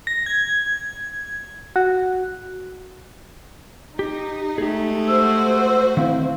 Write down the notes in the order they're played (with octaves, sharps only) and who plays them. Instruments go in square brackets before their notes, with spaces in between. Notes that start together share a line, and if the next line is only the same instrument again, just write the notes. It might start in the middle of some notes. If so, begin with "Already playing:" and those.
[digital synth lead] A#6
G#6
F#4
[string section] D#4 [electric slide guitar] G4
[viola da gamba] G#3 A3 [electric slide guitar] G4 G#4
[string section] F#4 C5 [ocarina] E6
[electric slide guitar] D#3 C4 E4 [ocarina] F5